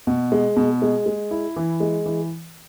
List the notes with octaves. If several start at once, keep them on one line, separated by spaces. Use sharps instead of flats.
B2
G#3
B2
G#3
G#3
E4
E3
G#3
E3